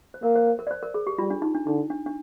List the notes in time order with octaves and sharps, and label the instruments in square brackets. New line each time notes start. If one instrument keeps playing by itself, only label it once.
[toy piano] C5
[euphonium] A#3 [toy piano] A#4
[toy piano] C5
C5
A#4
D5
C5
A#4
G#4
G4
[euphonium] G3 [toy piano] F4
[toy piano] D4
D#4
D4
[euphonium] D3 [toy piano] D#4
[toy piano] D4
D4